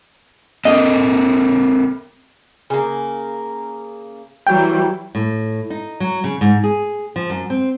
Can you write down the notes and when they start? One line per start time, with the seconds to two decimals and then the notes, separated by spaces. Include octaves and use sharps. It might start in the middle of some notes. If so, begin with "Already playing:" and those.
0.65 C4 A4 A#4 D#5
2.70 C#3 A#3
4.47 E3 F#3 G3 G5
5.15 A2
5.70 D#4
6.00 F#3
6.24 C#3
6.41 G#2
6.64 G#4
7.16 F3
7.30 F#2
7.50 C4